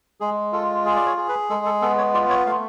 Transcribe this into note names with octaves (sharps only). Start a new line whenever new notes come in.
G#3 G#4
F4 A4
G#4
D5
C#5
G#4
B4
G#3 A4
A4
B3 A4
C#5
F4 D5
C#5
A3 F5